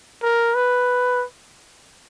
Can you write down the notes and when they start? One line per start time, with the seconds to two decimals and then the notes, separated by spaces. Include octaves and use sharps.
0.23 A#4
0.55 B4